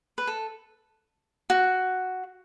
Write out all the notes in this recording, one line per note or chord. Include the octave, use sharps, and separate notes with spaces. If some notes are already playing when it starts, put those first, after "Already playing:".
B4
A4
F#4